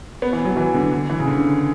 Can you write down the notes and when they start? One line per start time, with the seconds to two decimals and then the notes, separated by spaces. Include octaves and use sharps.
0.22 B3
0.33 E3
0.45 F#3
0.57 E3
0.74 D3
0.92 D3
1.10 E3
1.19 C#3
1.27 D3